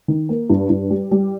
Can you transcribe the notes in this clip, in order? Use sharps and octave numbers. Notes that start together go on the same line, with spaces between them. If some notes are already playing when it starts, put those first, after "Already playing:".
D#3
A#3
G2
G2
G3
G3